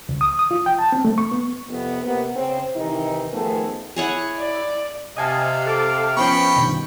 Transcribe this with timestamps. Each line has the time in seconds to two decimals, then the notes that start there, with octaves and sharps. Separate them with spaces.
0.09 C#2
0.21 D#6
0.39 D#6
0.51 F4
0.66 G5
0.79 A5
0.92 C4
1.05 A3
1.18 C#6
1.32 B3
1.69 F2 C3 B3
2.03 C3 A#3 B3
2.35 C#3 C4
2.75 C3 D#3 E3 D#4
3.33 D#3 F3 A3 B3 G#4
3.96 E4 G#4 C#5 F#5
4.38 D5
5.16 C3 D#5 F5 G#5 A5
5.66 A4 A5 D6
6.17 F3 B3 C#4 G5 B5 C#6
6.56 G2 B2 D#3